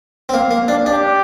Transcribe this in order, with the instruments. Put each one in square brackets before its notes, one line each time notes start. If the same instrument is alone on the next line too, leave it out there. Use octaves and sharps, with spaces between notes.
[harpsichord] C4
[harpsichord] A#3 [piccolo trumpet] F5
[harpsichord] A#3
D4
[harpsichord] D4 [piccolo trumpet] G4